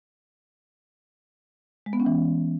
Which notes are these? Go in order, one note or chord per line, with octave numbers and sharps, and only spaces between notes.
G#3
B3
C#4
E3